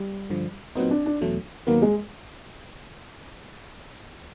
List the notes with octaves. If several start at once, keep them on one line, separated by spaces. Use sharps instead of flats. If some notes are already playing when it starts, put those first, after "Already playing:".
Already playing: G3
G2 D3 F3
A#2 F#3 B3 C4 D#4
D4
D4
E2 B2 F#3 A3
D#2 D#3 F#3 A#3 B3
G#3